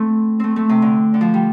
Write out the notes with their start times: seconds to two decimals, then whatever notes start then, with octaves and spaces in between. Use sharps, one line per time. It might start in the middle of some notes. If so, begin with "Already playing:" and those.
Already playing: A3 C4
0.40 A3 C4
0.56 A3
0.69 C3
0.82 D3
1.14 D3
1.21 F3
1.34 G3